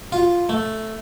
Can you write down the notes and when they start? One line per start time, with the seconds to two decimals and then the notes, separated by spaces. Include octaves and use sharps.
0.12 F4
0.49 A3